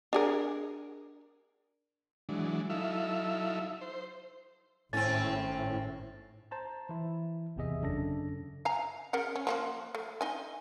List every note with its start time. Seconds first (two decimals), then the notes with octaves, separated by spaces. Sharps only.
0.13 D4 G#4 A#4
2.29 E3 F#3 G#3 D4
2.70 F#3 D#4 E4 A4 E5 F5
3.81 C5
4.93 G#1 A2 C4 C#4 A6
6.51 C5 A5 A#5
6.89 E3 E4
7.56 G#1 E2 C3 G#4 D#5 E5
7.82 F#2 C#3 C#4 D4 A4 A#6
8.65 F5 G#5 A#5
9.13 C#3 A#4 F#5
9.36 C#4
9.47 F3 A#3 F#4
9.95 A3
10.21 D#4 D#5 G#5